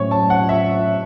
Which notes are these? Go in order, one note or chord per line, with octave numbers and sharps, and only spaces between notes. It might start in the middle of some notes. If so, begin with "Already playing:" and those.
Already playing: A2 F#3 A3 C#4 C#5
A5
F#5
E5